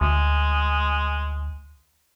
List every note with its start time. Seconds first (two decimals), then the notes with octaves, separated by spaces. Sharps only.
0.01 D2 G#3